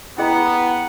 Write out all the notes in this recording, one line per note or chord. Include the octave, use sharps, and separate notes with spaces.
B3 E4 G#4 D#5 F#5 G5 A#5